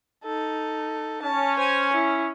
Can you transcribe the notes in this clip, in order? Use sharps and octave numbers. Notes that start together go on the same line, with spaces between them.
D#4 A4
C#4 A5
C5 G#5
E4